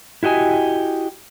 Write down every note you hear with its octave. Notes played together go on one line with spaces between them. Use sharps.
E4 F#4 G4 D#5 G#5